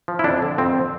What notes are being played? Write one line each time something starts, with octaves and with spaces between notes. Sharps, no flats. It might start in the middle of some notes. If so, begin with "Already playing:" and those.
F3
E4
F2 D4
D3
F2 C4